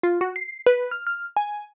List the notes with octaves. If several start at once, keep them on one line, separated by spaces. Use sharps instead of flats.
F4
F#4
C7
B4
F6
F6
G#5